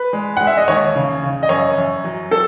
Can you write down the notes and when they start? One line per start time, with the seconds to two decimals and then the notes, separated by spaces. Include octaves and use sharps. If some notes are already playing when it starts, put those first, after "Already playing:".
Already playing: B4
0.13 G#3
0.37 G#3 F#5
0.47 E5
0.57 D#5
0.68 D#2 C#5
0.96 C#3
1.22 C#3
1.43 D#5
1.49 F#2 C#5
1.77 F#2
2.04 F#3
2.31 A4